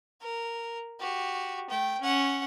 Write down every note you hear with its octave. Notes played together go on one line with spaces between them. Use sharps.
A#4
F#4 G4
A3 G5
C#4 F#5